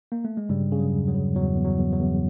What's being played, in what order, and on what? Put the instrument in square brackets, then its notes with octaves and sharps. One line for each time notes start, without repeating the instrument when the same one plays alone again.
[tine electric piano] A#3
A3
G#3
G2 C#3 G3
C#3
F#3
E2
F#3
C#3
E2 F#3
E2
F#3
E2
F#3
E2